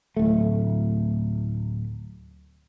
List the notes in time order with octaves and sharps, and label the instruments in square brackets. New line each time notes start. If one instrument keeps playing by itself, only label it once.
[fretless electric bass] D1 A3